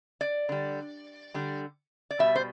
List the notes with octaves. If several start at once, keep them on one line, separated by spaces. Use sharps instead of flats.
D5
D3 G3
D3 G3
D5
B2 G3 E5
C5